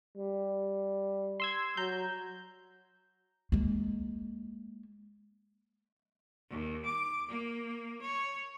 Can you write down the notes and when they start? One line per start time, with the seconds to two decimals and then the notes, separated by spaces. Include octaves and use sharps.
0.17 G3
1.40 C6 E6 G#6
1.77 F#3 A#5 G6
3.52 G#3 A#3
6.50 D#2
6.87 D6
7.30 A#3
8.03 C#5